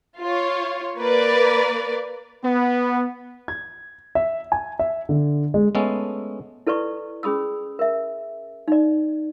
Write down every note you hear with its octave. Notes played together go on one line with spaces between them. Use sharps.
F4 C#5
A#3 A#4 B4 D5
B3
G#6
E5
G#5
E5
D3
G#3
G#3 A3 B3 C#4 A4
E4 A4 B4 D5 C#6
C#4 G#4 B5 D#6 E6
A#4 E5
D#4 D5